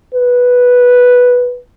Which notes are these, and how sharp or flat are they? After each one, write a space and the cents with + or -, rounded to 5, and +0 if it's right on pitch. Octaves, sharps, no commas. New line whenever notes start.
B4 -5